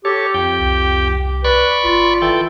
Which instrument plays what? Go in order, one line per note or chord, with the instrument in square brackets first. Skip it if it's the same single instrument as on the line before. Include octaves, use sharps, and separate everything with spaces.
[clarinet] G4 [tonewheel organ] A4 C#5
[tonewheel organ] F2 G5
[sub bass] C2
[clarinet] B4 [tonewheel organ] D5 B5 C#6
[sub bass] G#1 [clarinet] F4
[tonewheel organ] E3 A4 G5